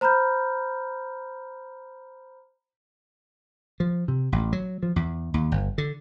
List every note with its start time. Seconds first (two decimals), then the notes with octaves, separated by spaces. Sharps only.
0.01 C5 A#5 B5 F6 G6
3.80 F3
4.08 C3
4.32 A1
4.53 F#3
4.83 F3
4.96 E2
5.34 D#2
5.52 G1
5.78 D3